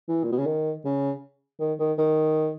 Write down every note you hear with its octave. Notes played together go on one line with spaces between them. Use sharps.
E3
A#2
B2
C#3
D#3
C#3
D#3
D#3
D#3